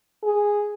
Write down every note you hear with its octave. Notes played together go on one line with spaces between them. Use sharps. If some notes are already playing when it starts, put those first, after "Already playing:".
G#4